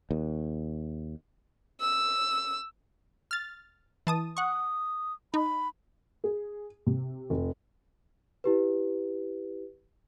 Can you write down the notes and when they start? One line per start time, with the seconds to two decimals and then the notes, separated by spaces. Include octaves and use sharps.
0.11 D#2
1.80 E6
3.31 F6 A6
4.07 E3 A5 D#6
4.37 F#5 C#6 D#6
5.34 D#4 B5
6.24 G#4
6.87 C3
7.30 F1
8.44 E4 G4 B4